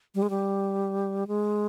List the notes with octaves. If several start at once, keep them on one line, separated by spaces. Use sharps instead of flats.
G3
G#3
G3
G#3